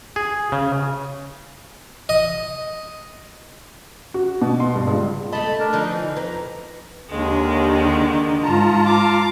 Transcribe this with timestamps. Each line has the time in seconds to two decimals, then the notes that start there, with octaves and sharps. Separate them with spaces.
0.16 G#4
0.52 C#3
2.09 D#5
4.14 F#4
4.42 B2
4.60 C6
4.75 G2
4.87 C#2
5.32 A3 D#5 A5 B5
5.60 D4 A#4
5.73 D3 F3 D#4
5.88 E3
6.17 F2 B4 A#5
7.09 D#2 D3 D#3 G#3
8.43 G#2 F4 A5 A#5
8.84 F5 D6